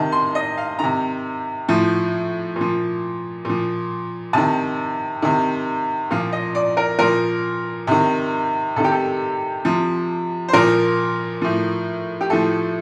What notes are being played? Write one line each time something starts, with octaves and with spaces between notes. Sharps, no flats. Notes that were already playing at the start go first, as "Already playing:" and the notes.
Already playing: C3 D#3 A5
C6
D#5
F5
C3 D#3 A#5
A2 F3
A#2 F3
A#2 F3
C3 D#3 A5
C3 D#3
A#2 F3 F5
D#5
D5
A#4
A#2 F3 A#4
C3 D#3
C3 D#3 G4 A4
A4
C3 F3
C5
A#2 F3 A#4
A2 F3
G4
A2 F3 A4